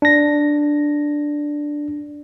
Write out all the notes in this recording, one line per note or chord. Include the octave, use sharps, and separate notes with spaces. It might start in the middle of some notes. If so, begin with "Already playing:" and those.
D4 A#6